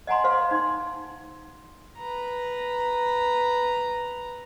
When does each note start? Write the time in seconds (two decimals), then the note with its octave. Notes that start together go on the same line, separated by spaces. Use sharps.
0.07 D#5 F#5 G#5 A#5 C6
0.24 C5 F5 C6
0.51 D#4 C6
1.98 B4 A#5